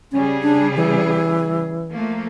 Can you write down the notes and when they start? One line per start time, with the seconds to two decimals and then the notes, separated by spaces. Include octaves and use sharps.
0.12 C#3 G3 C#4 G#4
0.42 D4
0.76 E3
1.92 F3 A3 A#3